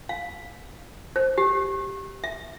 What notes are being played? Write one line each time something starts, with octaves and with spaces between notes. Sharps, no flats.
F5
C5
G4
E5